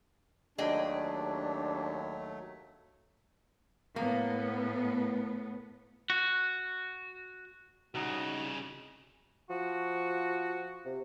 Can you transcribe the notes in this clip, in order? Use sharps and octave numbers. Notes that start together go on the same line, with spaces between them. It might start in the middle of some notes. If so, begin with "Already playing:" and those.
D#2 F#3 A3 D4 G#4 D#5 G5
A2 A#3 B3
F#4
C2 C#3 D#4 F#4
F3 F#4
C3